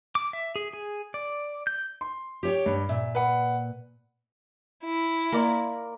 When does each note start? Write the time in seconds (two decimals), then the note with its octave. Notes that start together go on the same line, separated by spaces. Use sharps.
0.15 D6
0.33 E5
0.56 G#4
0.73 G#4
1.14 D5
1.67 G6
2.01 C6
2.43 G4 C#5 G5
2.66 G2
2.89 A#2 E5
3.15 B4 F#5
4.84 E4
5.32 A#3 A#4 D5 C6